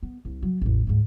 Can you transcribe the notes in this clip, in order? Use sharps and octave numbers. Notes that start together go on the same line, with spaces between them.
B3
C2
F#3
A1 E2
D2 G#2